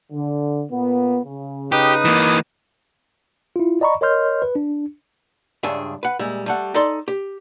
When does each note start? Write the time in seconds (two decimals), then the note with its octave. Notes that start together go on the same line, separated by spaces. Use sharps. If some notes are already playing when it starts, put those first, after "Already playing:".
0.12 D3
0.70 A#2 B3
1.25 C#3
1.72 D#4 G4 B4 D#6
2.05 E3 A#3
3.56 E4 F4
3.81 D5 D#5 A#5 B5 C#6
4.01 A#4 C#5 D#5 C6 F6 G6
4.42 B4
4.55 D4
5.63 C#2 G2 D4 G#4 E5
6.03 B4 F#5
6.19 A#2 G3 G#3 E5
6.46 G3 A3 F#5
6.74 D#4 A4 D5 C6
7.08 G4